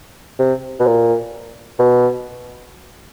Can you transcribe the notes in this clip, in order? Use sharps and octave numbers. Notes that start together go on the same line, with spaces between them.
C3
B2
A#2
B2